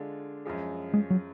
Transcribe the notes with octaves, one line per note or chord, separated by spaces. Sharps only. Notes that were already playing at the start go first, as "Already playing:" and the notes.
Already playing: D3 G#3 D4 F4
F#2 F3 G#3
G#3
F#3